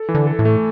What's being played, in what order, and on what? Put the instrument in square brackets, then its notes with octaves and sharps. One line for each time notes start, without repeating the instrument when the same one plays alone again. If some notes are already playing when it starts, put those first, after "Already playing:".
Already playing: [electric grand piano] A4
E3
[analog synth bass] D3
[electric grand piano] A4
[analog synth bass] A2
[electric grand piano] A3